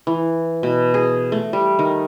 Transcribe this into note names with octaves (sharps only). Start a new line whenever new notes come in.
E3
B2
G#4
A3
G3
D#3